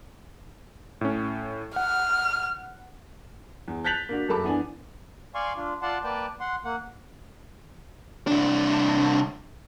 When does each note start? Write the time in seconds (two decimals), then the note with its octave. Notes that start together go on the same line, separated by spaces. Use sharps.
1.01 A2 C#4
1.76 F#5 F6
3.68 E2
3.84 F#6 G6 A6 B6 F7 F#7
4.09 A#3 D4 F#4
4.29 F#2 A#3 A4 A5 B5 D6
4.44 E3 B3 D4 G#5
5.35 D5 F5 G#5 C6 C#6
5.56 D4 F4
5.82 F4 D5 F#5 A5 C6
6.03 A#3 B4 D5 G5 A5
6.40 F#5 C6
6.64 A#3 F#5
8.27 C2 D4